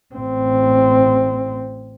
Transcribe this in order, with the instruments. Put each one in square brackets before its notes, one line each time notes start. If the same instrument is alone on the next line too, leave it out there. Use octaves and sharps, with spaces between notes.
[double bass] A1 C4